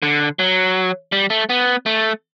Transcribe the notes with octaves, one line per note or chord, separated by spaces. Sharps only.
D3
F#3
G3
A3
B3
A3